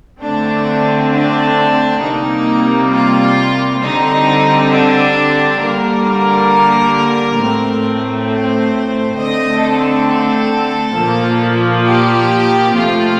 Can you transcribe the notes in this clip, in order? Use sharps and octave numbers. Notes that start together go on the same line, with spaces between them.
D3 A3 C4 D4
D4
C3 G3 A#3 D#4
F4
D3 G3 C4 D#4
D4
D3 G3 A#3 A#4
A2 A3 C4
C5
D3 A3 C4 D#5
A4
A#2 F3 A#3
G4
C3 F3 A3 F4